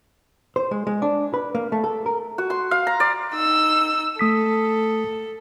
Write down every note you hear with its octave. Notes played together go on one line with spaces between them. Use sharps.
C5
G#3
G#3
D4
B4
A#3
A3
A4
A#4
F#4
C6
F5
A#5
D5
D#4 E6
A3 A4 D#6 B6